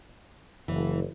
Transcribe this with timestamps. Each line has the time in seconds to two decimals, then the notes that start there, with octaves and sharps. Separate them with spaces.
0.68 F#1 E3